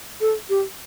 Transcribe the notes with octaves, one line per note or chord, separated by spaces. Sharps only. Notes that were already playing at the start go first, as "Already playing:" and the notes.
A4
G4